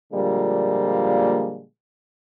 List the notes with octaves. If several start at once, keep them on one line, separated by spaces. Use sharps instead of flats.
A#2 D3 F3 G3 G#3 A#3